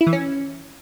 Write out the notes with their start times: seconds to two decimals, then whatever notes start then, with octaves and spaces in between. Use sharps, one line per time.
0.01 E4
0.07 E3
0.13 C#4